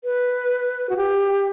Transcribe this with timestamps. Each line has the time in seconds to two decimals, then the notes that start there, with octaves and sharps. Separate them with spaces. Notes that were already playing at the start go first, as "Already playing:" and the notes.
0.04 B4
0.89 F#4
0.97 G4